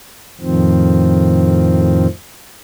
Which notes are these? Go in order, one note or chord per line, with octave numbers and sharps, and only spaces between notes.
F2 A2 D#3 F3 C4